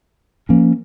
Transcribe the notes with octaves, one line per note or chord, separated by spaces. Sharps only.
F3 A#3 C#4